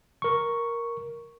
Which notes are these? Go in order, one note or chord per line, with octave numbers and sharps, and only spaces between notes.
A#4 C#6